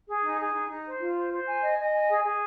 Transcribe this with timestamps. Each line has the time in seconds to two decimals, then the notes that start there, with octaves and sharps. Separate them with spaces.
0.08 G#4
0.23 D#4
0.39 G#4
0.54 D#4
0.70 D#4
0.86 C5
1.00 F4
1.16 C5
1.31 C5
1.47 G#5
1.62 D#5
1.78 D#5
1.93 G#5
2.09 G#4
2.24 G#4